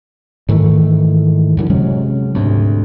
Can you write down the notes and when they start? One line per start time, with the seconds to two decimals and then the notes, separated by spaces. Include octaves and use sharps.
0.49 G#2 D#3 E3 A3
1.57 F#2 D3 E3
1.70 C3 F#3 G#3 C#4
2.35 D2 G#2 C3